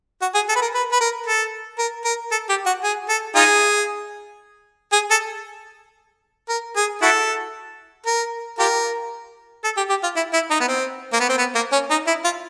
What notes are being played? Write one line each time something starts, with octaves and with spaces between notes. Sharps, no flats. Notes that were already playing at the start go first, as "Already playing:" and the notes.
F#4
G#4
A4
B4
A#4
B4
B4
A#4
A4
A#4
A#4
A4
G4
F#4
G#4
A4
D#4 F4 G#4
G#4
A4
A#4
G#4
E4 F#4 A4
A#4
F4 G4 A#4
A4
G4
G4
F4
E4
E4
D#4
B3
C4
A#3
B3
C4
B3
A#3
C#4
D#4
E4
F4